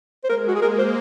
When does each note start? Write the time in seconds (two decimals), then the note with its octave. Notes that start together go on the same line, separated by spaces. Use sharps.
0.24 C5
0.29 G#3 A#4
0.48 F#4
0.55 G#4
0.61 A#3 A#4
0.78 C5